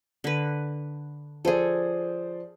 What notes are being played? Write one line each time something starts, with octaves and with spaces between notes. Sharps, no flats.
D3 B4
F3 G#4 A4 C5 D5